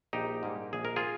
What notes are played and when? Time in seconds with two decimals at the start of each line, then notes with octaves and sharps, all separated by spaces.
0.13 A#1 D#4 G4
0.43 G#2 G3 A#3
0.73 A#1 G#4
0.85 A#4
0.96 F4 G#4